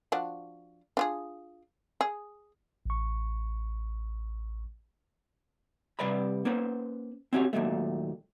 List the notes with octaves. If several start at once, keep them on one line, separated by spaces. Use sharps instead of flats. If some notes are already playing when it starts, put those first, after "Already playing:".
F3 D4 F#4
D4 F4 G#4
G#4
A1 C#6
C3 G3 B4 D5 A#5 B5
A#3 C#4 B4 C5
C4 C#4 F#4 G4 C#5
D#2 A#2 F#3 G#3 A3